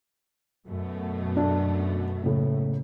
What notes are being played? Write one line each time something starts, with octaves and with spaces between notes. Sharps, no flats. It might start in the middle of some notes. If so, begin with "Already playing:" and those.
F#2 B2 A3
D4
F#1 A2